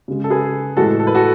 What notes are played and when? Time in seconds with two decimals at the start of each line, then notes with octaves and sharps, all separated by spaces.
0.08 C#3 G#3
0.24 A4
0.30 G#4 B4
0.77 A2 E3 G#3 F#4 A4
1.00 A4
1.07 B4
1.15 F#4 A4